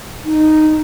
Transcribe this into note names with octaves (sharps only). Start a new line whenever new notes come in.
D#4